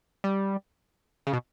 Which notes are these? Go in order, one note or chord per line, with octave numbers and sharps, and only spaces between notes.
G3
C#3
B2